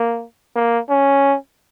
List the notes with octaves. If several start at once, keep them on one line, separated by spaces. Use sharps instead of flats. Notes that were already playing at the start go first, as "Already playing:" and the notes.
Already playing: A#3
A#3
C#4